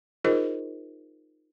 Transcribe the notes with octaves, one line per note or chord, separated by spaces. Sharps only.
D#4 F4 G#4 A#4 C5 D#5